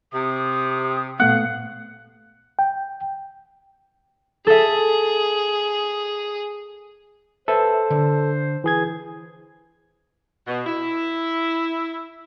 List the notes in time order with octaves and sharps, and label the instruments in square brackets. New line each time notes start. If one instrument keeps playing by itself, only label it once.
[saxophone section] C3 [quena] D#6
[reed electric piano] A#2 A3 B3 [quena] F5 [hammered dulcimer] F#5
[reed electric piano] G5
[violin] G#4 [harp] A4 E5
[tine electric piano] A4 [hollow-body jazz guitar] B4 E5 [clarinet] C5
[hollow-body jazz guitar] D3
[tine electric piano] E3 G#4 G#6
[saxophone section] B2
E4